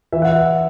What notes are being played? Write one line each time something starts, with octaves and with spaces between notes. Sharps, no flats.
E3 E5
F#5
E5